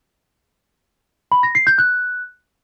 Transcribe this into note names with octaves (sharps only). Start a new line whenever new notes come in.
B5
A#6
C7
G6
F#6